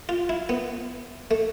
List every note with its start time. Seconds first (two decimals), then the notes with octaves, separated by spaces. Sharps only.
0.09 F4
0.29 E4
0.49 B3
1.31 A3